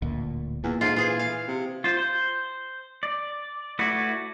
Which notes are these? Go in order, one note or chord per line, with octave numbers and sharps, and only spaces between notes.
D1 D2 A#2
E2 A#2
G#2 F4
E3 F4 G#4
F5
C3
F4 C5
C5
D5
A3 E4 F#4 B4 D5